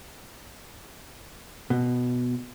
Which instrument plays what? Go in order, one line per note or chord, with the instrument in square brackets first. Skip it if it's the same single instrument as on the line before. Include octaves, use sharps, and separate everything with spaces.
[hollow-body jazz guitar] B2